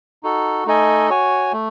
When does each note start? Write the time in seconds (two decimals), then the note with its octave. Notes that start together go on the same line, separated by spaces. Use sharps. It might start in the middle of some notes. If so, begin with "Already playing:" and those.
0.23 D#4 F#4 A4
0.66 A3 D#4 A4 D#5 G#5
1.10 F#4 C#5 G#5
1.53 A3